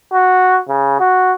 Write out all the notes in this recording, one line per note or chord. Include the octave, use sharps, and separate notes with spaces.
F#4
C#3
F#4